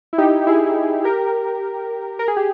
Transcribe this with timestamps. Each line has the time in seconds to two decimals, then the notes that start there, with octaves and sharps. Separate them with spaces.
0.13 E4
0.18 D#4 G4
0.47 E4 G#4
1.04 G4 A#4
2.19 A#4
2.28 G#4
2.37 G4